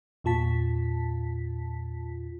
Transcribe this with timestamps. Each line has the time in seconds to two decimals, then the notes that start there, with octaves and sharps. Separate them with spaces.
0.24 E2 A#2 F4 A5 B6